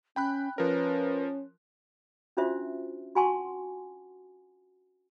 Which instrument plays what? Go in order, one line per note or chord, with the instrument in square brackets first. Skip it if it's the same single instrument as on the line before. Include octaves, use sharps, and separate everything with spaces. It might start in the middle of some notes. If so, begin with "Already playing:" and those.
[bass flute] C#4 [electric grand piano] G5 B5 F#6
[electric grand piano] F3 A#4 [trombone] C#4 [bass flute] B4
[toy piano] C#4 D4 F4 F#4 C5 E5
F#4 F#5 G#5 A5 C6 C#6